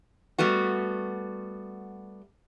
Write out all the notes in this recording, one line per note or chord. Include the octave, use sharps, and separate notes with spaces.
G3 A3 B3 F#4